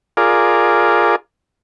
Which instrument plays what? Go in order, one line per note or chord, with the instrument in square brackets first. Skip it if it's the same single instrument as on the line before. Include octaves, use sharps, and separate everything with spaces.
[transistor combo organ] F4 G#4 A#4 D5